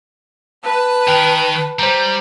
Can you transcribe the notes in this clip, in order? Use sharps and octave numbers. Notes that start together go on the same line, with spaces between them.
B4 A5 F#6
D#3 A#4 G5
G3 C5 A#5